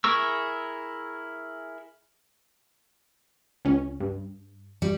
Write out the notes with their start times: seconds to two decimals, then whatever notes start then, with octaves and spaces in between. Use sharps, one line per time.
0.04 E4 G#4 A#4 C#6 E6
3.65 C#2 C#4
4.00 G2
4.82 G3